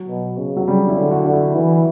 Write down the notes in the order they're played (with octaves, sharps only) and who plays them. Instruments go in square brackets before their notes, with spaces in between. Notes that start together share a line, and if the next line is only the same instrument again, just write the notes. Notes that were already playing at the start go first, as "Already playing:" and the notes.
Already playing: [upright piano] F#3
[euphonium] B2
C#3
[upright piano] F#3
[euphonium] C#3 [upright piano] G3
[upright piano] D4
E4
[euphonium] D3
[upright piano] F#4
[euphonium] D3 [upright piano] F#4
[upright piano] E4
[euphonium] E3